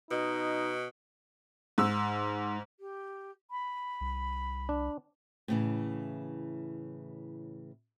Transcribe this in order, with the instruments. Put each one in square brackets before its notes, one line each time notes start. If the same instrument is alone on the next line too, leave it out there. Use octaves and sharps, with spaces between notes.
[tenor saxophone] B2 [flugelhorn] D#4
[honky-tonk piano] G#2 E6
[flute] G4
B5
[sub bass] C2
[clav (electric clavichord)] D4
[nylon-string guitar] A2 C#3 E3